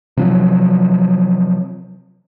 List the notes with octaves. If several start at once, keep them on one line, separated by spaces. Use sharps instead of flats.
C3 F3 F#3